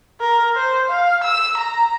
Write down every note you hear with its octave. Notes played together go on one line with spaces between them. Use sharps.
A#4
C5
F5
E6
A#5